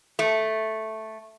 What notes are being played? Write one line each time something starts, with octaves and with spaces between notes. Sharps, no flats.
A3